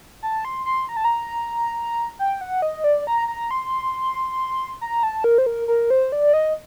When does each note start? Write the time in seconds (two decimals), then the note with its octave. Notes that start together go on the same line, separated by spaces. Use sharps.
0.23 A5
0.45 C6
0.66 C6
0.89 A#5
0.97 A5
1.05 A#5
2.19 G5
2.41 F#5
2.62 D#5
2.84 D5
3.07 A#5
3.28 A#5
3.51 C6
4.81 A#5
5.03 A5
5.24 A#4
5.38 C5
5.46 A#4
5.68 A#4
5.90 C5
6.12 D5
6.33 D#5